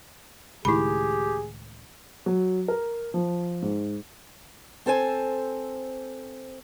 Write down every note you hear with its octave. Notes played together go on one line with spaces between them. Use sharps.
C#2 A2 D#3 E4 G4 G#4 B5
F#3
A#4
F3
G#2
C4 A4 C5 G#5